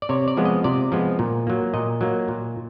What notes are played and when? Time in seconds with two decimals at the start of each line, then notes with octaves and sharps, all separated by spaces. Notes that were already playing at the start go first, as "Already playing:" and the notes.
0.02 D5
0.09 C3 C#5
0.28 D5
0.37 F3 G#3 B3
0.45 D#5
0.64 C3 D5
0.92 F3 G#3 B3
1.19 A#2
1.47 F#3 A#3
1.74 A#2 D#5
2.01 F#3 A#3
2.28 A#2